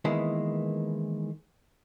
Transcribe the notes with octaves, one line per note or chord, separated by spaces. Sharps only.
D#3 E3 G#3 A#3 B3 E4